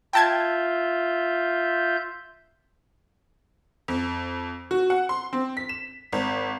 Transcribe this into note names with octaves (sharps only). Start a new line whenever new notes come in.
F4 E5 G5 A5 G6 G#6
F2
F#4
F#5
C6
C4
B6
E7
G#1